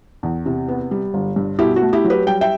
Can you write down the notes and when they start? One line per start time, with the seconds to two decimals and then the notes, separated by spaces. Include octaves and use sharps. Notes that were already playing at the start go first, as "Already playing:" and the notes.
0.23 E2
0.46 C3
0.68 B3
0.91 G3
1.14 G1
1.36 G2
1.59 B2 E4 G4
1.76 F#4
1.82 A3
1.93 E4 G4
2.04 F#3
2.10 G4 B4
2.27 G3 G5
2.41 E5 G5